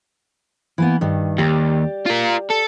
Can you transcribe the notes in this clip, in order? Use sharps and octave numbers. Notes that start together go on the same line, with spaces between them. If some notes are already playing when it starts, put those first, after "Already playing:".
E3 A#3 B3
G2 D#3
D#2 G4 D5
F4 A#4
A4